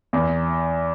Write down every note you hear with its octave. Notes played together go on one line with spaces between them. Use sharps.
E2